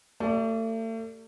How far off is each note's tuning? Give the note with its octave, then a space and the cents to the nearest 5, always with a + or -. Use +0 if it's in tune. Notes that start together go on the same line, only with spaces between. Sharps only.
A3 +40 G4 +10 D5 +0